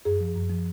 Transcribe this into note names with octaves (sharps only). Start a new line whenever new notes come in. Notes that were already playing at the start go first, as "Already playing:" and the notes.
F#2 G#4
F3
F#2
F3